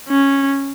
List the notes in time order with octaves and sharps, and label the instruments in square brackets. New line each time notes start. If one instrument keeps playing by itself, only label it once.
[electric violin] C#4